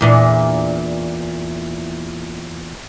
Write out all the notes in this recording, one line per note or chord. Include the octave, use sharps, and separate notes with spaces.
E2 A#2 D4